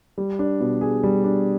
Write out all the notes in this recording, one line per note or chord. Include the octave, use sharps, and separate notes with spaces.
G3
D4
B2
G#4
G3
D4